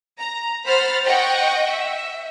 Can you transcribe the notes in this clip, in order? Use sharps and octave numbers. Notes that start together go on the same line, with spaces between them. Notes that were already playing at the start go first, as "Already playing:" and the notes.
A#5
C5 F#5 B5 F6 A6
D#5 F#5 G5 C#6
E5